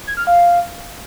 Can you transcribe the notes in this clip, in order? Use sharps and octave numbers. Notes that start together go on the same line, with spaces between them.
G#6
F6
F5